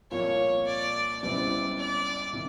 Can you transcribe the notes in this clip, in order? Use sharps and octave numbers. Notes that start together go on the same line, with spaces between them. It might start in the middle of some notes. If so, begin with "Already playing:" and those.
C2 A#2 F3 A#3 C#5
D5
C#2 B2 G3 C4 E4 D5
D5
C3 D#3